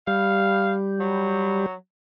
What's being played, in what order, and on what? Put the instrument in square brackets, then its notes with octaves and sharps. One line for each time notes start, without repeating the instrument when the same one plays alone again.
[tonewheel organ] G3 [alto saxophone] F5
[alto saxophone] F#3